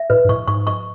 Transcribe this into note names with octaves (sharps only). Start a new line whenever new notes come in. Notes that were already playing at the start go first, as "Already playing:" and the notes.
Already playing: E5
A2 B4
G#2
A2 C#6
G#2 C#6
C#6